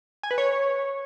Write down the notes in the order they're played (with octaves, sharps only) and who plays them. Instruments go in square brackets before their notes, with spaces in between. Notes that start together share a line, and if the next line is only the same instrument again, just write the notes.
[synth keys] G#5
B4
C#5